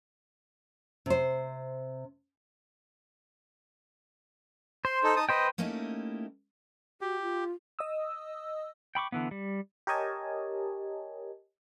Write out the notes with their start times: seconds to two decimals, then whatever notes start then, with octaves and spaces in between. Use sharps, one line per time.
1.06 C3 C5
4.85 C5 C6
5.04 D#4 A4
5.16 D#4 A5 D#6
5.29 B4 C5 D#5 G5
5.58 A3 A#3 C#4 D#4 E4 G4
7.01 F#4 G4
7.22 F4
7.79 D#5 D#6 E6
8.95 G5 B5 C#6 D6
9.12 D3 E3 B3
9.31 G3
9.87 G4 A#4 C#5 D#5 G#5 A5